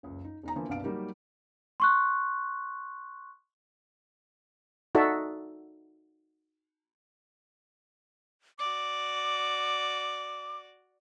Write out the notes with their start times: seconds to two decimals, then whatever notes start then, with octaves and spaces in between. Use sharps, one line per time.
0.03 F#1 C#2
0.24 D#4
0.43 E1 D#4 A#5
0.56 D3 E3 F3 A#3
0.69 C2 G2 B2 D4 F5 D7
0.83 F#3 G3 A#3 D#4 G4 A#4
1.80 C6 C#6 F#6
4.95 D#4 F#4 A4 D5 E5
8.59 F#4 D5 D6